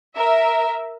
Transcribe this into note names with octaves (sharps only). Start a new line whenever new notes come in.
A#4 E5